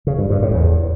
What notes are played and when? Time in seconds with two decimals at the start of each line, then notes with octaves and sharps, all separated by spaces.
0.07 C#3
0.18 G2
0.30 G2
0.42 A2
0.54 E2